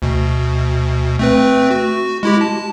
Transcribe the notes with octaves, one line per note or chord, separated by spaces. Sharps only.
D2 B2
A3 C4 B4
F#4
G#3 E4 G4
A5